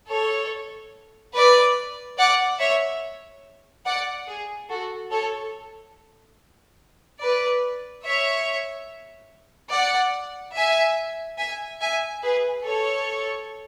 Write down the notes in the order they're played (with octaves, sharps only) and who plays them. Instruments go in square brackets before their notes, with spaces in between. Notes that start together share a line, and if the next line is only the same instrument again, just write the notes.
[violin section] A4 C#5
B4 D5
D5 F#5
C#5 E5
D5 F#5
G#4
F#4 A4
A4 C#5
B4 D5
C#5 E5
D5 F#5
E5 G#5
E5 G#5
E5 G#5
G#4 B4
A4 C#5